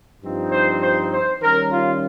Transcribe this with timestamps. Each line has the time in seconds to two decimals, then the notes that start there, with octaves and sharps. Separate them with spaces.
0.22 G2 F3 C4 D#4
0.51 C5
0.81 C5
1.10 C5
1.40 D#3 G3 C#4 A#4
1.69 F4